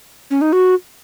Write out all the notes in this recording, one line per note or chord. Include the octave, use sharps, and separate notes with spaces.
C#4
D#4
F#4